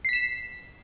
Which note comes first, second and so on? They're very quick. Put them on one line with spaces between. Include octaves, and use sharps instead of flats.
C7 B6 E7